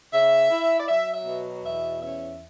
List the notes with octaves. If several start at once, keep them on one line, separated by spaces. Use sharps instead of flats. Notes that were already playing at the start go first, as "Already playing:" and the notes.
C#3 E5
E4
D5
F#3 E5
E5
B2
E2 E5
C#4 E5